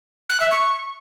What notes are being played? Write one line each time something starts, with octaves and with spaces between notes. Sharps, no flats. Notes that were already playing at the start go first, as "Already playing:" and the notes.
F#6
E5
C#6